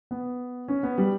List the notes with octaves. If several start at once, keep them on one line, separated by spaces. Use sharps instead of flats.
B3
C#4
B3
G3